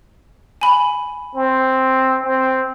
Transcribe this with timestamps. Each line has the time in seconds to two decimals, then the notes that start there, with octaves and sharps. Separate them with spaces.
0.61 G#5 B5
1.35 C4
2.23 C4